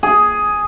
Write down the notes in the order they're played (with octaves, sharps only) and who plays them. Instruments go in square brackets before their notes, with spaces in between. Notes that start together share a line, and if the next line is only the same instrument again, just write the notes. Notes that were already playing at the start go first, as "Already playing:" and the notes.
[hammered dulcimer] G#4